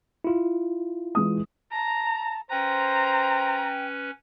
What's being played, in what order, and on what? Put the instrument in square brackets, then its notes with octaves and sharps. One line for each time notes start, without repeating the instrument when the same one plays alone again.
[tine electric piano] E4 F4
[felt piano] E3 G#3 D#6
[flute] A5 [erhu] A#5
[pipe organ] C#4 B4 [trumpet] C5 [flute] G5 [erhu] A#5